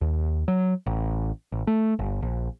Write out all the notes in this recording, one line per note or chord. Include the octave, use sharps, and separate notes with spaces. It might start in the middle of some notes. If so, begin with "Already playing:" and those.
D#2
F#3
A1
A1
A3
G1
A#1